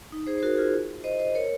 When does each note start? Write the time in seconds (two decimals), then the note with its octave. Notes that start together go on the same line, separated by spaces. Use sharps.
0.12 D#4
0.27 G#4 C5
0.38 C5
0.43 F#4 A#4
0.57 F4 G#4
1.04 C5 D#5
1.19 C5 D#5
1.35 A#4 C#5